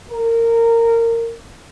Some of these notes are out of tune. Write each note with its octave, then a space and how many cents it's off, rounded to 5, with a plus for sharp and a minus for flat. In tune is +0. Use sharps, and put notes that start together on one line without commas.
A#4 -20